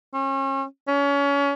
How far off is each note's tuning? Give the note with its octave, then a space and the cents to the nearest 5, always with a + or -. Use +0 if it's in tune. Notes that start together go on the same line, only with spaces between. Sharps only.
C#4 -35
C#4 +30